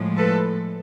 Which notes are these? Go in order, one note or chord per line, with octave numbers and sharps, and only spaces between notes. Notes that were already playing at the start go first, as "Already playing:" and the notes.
Already playing: A2 F3 G#3
A4 B4